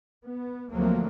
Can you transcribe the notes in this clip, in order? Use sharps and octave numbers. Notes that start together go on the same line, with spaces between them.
B3
D2 F3 F#3 A3 A#3 C4